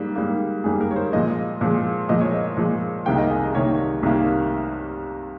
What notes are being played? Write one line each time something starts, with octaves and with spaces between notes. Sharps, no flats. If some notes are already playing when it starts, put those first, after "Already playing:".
Already playing: G#2 G3 A#3
G#2 G3 A#3
G#2 G3 A#3 G#4
A#4
C#5
C5
A#2 F3 G#3 D#5
A#2 F3 G#3
A#2 F3 G#3 D#5
C#5
D#5
A#2 F3 G#3
C2 C3 D#3 A#3 G5
D#5
G#4
C2 C3 D#3 A#3 C#5
C2 C3 D#3 A#3